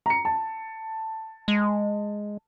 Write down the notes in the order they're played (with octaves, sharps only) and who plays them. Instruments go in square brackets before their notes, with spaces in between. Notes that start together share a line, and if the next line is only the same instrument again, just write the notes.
[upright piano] A#5 C#7
A5
[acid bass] G#3